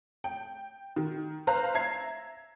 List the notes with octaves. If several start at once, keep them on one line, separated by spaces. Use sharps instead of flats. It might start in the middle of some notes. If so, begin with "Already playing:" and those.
G5
D#3
B4 C5 F5 A#5
E5 A#5 G#6 C7